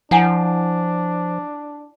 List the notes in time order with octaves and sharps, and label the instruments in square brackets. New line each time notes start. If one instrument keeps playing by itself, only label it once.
[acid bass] F3 [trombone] D4 [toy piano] E4 F#5 G#5